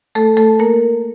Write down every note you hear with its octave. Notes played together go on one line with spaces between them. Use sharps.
A3 A4
A3 A4
A#3 A#4